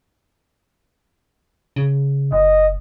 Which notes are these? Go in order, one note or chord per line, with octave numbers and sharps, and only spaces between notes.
C#3
F#1 D#5